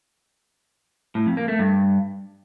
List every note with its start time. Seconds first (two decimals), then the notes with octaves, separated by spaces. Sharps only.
1.15 A2
1.26 F2
1.37 A#3
1.48 A3
1.59 G2